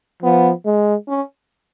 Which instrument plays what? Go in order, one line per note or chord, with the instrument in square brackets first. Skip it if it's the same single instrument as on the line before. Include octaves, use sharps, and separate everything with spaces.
[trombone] F3 [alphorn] B3
[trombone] G#3
[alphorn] C#4